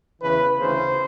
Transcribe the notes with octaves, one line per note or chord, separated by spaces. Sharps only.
E2 C#3 E3 B4
D2 C#3 E3 C5